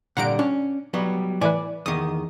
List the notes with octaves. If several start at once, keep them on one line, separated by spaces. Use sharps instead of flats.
A#2 D3 G3 F#5 A#5 D7
C#4 D4
F#3 G3 B3
A2 E3 B4 D5 G#5
E2 D#3 D#6